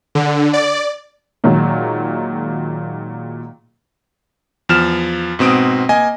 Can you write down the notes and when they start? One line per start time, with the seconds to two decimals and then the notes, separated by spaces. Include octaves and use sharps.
0.15 D3
0.53 D5
1.44 A#2 D#3 F#3 G#3
4.69 E2 F3 F6 E7
5.39 G#2 B2 C4 D#6 D7
5.89 A#3 D#5 G#5